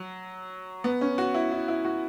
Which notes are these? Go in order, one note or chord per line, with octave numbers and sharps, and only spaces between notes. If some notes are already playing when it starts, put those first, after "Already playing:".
Already playing: F#3
B3
C#4
F#4
E4
E4
E4
F#4